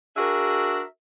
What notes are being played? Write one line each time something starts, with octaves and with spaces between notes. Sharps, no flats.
D4 F#4 G#4 A#4 E5